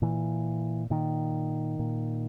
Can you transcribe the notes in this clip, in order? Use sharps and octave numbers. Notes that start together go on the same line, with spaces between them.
A#2 E3
A#2 D#3
A#2